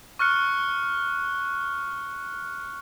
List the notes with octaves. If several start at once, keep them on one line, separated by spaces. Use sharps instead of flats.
C#6 F6 F#6 C#7